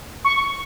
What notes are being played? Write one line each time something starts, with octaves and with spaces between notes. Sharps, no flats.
C#6